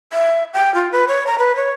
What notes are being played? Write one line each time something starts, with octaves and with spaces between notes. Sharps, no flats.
E5
G5
F4
B4
C#5
A#5
B4
C#5